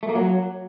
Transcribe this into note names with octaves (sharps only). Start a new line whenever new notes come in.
A3
A#3
F#3